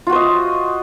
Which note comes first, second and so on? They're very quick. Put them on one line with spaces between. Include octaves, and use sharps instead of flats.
F4 F#4 C5 D#5